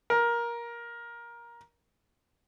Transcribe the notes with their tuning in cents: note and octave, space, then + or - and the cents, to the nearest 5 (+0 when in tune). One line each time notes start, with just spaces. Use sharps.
A#4 +15